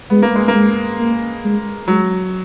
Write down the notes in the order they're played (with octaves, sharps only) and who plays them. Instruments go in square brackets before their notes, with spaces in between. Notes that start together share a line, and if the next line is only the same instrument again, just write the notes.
[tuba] G#3 [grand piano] B3
[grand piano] A#3
G#3
A#3
[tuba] G#3
A#3
G#3
[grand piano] F#3 [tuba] G#3